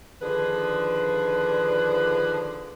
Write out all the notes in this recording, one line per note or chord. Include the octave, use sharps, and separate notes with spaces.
D3 D#3 F3 D4 G#4 B4